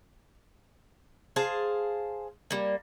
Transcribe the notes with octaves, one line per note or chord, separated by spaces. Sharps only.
G#4 C5 F5 A5
G3 A#3